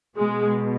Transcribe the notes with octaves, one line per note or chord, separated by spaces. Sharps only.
B2 G#3